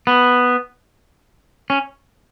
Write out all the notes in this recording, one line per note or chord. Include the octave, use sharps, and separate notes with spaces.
B3
C#4